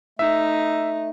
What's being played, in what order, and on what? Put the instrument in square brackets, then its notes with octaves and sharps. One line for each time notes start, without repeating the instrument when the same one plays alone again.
[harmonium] A3 [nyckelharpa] D#4 [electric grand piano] E5